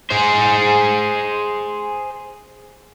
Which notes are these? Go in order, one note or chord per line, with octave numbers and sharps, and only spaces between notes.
G#4 C5